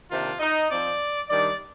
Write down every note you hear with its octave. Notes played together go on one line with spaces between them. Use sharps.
C3 D#3 A#3 D4 F4
D#4
F3 C4 D5
D#3 G3 D4 D5